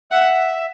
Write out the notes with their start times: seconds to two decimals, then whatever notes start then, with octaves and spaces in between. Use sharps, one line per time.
0.11 E5 F#5